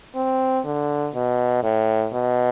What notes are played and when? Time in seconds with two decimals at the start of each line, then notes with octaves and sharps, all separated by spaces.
0.16 C4
0.65 D3
1.14 B2
1.64 A2
2.13 B2